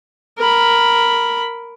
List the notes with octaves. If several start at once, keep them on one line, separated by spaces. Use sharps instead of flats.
A#4 B5